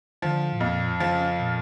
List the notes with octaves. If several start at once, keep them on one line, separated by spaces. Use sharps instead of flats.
D3 F3
A2
F2 A#2
C#3 F3
A#2